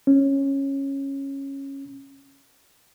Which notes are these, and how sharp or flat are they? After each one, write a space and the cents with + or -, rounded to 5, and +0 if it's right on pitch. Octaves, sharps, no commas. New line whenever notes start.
C#4 -15